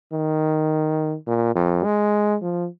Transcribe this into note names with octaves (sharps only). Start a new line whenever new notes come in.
D#3
A#2
F2
G#3
F3